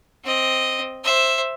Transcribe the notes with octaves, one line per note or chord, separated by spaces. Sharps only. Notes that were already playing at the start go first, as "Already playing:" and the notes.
C4 D#5
C5 E5